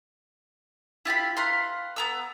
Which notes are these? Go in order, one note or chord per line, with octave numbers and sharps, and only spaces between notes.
E4 F4 G4 B5
B4 F5 A#5 C6
B3 A#5 E6